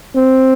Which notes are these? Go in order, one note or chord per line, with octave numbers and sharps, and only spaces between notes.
C4